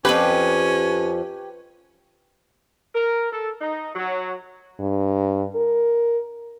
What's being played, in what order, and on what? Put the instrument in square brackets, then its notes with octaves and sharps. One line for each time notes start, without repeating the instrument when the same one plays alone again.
[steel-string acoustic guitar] F2 G#2 F3 [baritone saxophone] C#4 [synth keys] G4 [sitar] B4
[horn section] A#4
A4
D#4
F#3
[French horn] G2
A#4